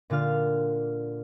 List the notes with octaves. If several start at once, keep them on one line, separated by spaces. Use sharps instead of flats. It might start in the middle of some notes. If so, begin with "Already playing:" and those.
A#2 D3 F4 F5 F6